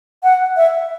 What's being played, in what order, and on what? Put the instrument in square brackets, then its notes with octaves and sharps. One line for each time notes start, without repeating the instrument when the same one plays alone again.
[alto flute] F#5
E5